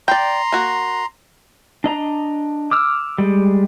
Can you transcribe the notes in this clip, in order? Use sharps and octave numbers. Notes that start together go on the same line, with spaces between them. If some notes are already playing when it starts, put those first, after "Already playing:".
D5 G5 A#5 C6
A#3 F#4
D4 D#5 A#5
D6 E6 F6
G3 G#3